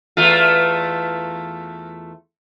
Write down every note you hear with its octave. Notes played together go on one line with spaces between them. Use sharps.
E2 A3 F4